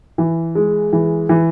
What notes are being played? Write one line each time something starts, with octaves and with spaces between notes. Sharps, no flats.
E3
G#3
E3
E3